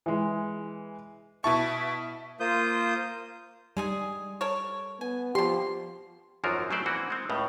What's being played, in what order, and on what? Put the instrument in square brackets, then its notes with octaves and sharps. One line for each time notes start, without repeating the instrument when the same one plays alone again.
[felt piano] E3 G#3
[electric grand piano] B2 E4 C#6 [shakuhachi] E5 [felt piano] A5
[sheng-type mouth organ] A#3 F4 C5 D#6 G6
[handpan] G3 [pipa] G#3 D#4 G#4
[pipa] A4 A#4 C#5
[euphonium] B3 [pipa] G#5
[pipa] B2 C6 [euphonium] F3 [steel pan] G4
[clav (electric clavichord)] G#1 F#2 F3 F#3 F4 A#4
F#3 G3 A3 C5 D5
E3 A#3 C4 F#4
G#3 C4
C#2 A2 C#3